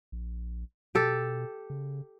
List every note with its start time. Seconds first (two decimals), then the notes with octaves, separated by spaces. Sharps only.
0.12 A#1
0.95 B2 G4 A4
1.70 C#3